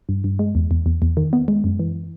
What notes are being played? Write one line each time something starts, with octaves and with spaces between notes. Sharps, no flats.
G2
G2
G#3
E2
E2
E2
E2
D#3
B3
G#3
F#2
E3